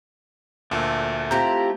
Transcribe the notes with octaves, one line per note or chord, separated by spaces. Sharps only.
D2 A#2 A3
C4 E4 F4 G4 A#5 G6